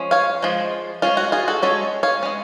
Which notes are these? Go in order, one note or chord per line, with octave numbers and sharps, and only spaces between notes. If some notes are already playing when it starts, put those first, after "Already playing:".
Already playing: F3 G#3 C#4
C#5 F5
F3 G#3
G#3 C#4 F4
F#4
F4 G#4
F#4 A4
G#3 C#4 A4 C#5
C#5 F5
G#3 C#4